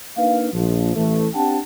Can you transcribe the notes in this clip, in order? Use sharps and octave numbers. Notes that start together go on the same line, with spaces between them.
A#3 D4 D#4 B4 F5
A#1 F3
A1 E3 A3
C4 D4 G4 F#5 G5 A5